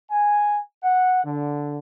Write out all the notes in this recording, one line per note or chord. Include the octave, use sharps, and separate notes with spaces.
G#5
F#5
D3